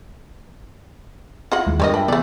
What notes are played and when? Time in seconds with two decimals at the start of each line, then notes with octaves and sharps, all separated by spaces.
1.52 E4 F4 D#5 F#5
1.67 D#2 G#3
1.80 G2 G3 F4 A#4 C#5 D#5
1.94 B4 E5 G5 A5
2.08 C3 E3 A3 B3 D5 G#5